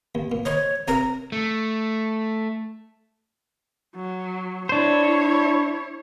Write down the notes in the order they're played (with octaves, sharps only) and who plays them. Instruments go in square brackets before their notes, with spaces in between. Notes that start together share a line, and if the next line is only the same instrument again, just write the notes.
[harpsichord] D#2
A#2
[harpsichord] C5 D#5 A#5 [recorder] C#5
[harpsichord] C3 C4 A#4 [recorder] A#5
[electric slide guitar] A3
[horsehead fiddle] F#3
[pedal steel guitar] D4 C5 [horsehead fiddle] E4 C#5